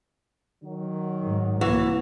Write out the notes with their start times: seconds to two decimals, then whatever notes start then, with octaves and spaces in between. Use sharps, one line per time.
0.64 D#3 F#3
1.24 G#2
1.61 C2 E3 A#3 F#4